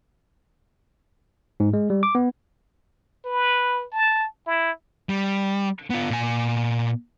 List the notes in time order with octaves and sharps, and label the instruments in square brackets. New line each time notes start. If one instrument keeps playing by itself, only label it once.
[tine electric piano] G#2
G#3
G3
D6
B3
[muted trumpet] B4
A5
E4
[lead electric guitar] G3
B3 F4
A#2 G#5